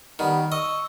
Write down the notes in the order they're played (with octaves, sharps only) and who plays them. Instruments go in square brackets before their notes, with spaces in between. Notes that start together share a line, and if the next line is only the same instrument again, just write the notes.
[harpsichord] D#3 [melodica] G3 B3
[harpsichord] D#5 [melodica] C#6 E6